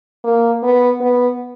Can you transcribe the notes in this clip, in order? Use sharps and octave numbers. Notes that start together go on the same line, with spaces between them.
A#3
B3
B3